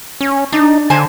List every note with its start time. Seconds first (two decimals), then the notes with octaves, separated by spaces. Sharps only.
0.20 C#4
0.52 D4 D#4
0.90 D3 C5 G#5 A5